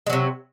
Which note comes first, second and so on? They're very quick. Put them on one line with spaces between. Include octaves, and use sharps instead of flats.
G#3 F#3 C3